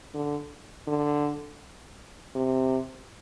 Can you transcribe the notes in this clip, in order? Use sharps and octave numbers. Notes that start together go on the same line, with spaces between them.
D3
D3
C3